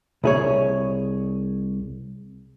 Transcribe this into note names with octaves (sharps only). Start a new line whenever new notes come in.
C2 G#4 C#5